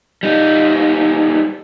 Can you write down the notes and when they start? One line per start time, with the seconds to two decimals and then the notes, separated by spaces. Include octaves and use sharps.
0.23 G3 D#4